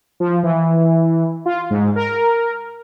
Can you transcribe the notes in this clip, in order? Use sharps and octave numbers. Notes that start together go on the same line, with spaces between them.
F3
E3
F4
G#2
A#4